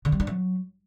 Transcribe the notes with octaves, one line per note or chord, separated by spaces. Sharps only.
D3
G3
D4
F#3